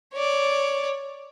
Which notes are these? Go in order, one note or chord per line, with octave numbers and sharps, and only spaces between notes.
C#5 D5